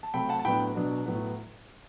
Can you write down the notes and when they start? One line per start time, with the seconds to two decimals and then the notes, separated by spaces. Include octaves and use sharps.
0.03 A5
0.14 C3 F#3 A3 C4 G5 B5
0.29 F#5 A5
0.39 A5
0.45 A2 F#3 B3 D4 G5 B5
0.75 B2 F#3 B3 D4
1.06 A2 F#3 B3